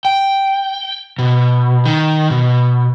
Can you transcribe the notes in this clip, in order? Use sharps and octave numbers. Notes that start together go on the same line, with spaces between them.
G5
B2
D#3
B2